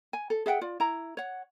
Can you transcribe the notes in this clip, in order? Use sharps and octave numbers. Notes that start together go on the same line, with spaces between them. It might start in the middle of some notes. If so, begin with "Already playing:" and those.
G#5
A4
G#4 E5 F#5 G5
F4 D5
E4 A#5
C#5 F#5